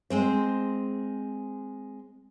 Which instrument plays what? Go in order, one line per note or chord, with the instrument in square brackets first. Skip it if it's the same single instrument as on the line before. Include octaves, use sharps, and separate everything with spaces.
[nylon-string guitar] G#3 C4 C5